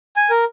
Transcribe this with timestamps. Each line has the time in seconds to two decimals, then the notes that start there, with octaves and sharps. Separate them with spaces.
0.16 G#5
0.30 A#4